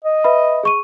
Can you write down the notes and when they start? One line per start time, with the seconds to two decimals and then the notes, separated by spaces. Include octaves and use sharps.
0.04 D#5
0.24 B4 E5 B5
0.63 G#4 C#6 D#7